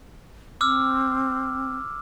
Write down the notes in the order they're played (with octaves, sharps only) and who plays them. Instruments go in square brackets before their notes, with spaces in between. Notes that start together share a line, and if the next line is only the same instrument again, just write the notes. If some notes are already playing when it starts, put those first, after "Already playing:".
[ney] C4 [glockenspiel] D6 E6 F6